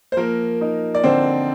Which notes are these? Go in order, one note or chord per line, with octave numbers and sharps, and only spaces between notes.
C5
F3 A#3 A#4
D#4
D5
D3 C4 C5